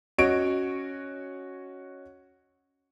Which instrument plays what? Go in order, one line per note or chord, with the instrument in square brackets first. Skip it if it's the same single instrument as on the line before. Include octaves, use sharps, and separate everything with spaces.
[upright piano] C#4 F#4 C#5 D#5 D7